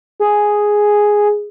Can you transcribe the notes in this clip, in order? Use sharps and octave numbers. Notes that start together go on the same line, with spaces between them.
G#4